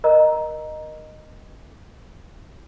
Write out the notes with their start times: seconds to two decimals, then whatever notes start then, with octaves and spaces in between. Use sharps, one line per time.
0.04 A#4 D#5 A#5